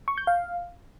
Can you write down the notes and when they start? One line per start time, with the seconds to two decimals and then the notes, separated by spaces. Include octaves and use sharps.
0.08 C#6
0.18 G6
0.27 F5